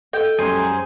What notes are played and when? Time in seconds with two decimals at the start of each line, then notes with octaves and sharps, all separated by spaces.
0.13 A4 D#5 G5
0.39 F#2 G3 G#3 G#4 C5
0.59 A#5